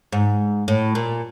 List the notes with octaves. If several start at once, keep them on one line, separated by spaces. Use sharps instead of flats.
G#2
A2
A#2